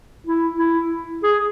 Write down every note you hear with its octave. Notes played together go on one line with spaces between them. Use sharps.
E4
E4
G#4